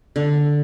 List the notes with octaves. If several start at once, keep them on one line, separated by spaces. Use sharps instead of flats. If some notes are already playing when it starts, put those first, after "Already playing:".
D3